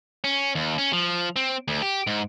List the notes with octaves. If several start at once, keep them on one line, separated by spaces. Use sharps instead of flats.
C#4
D#2
C#4
F3
C4
D2
G4
G#2